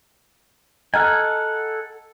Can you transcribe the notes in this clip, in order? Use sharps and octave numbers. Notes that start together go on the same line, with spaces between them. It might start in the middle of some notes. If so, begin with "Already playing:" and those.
A4 D#5 F#5 G#5 A#5 F6